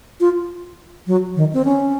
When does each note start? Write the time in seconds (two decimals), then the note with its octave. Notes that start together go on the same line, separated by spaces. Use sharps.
0.20 F4
1.07 F#3
1.36 D#3
1.53 C4
1.65 C#4